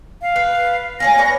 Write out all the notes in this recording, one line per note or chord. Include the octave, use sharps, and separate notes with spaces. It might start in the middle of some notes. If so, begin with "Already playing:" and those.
F5
B4
C#4 G#4 F5 A#6
B3 D4 C#5